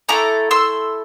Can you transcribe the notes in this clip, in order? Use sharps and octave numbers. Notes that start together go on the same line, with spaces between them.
A3 E4 A4 A#5 D6
C6 E6